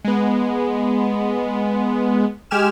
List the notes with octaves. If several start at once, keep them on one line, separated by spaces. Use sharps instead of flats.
G#3 B3
G#3 G4 G#5 F6 E7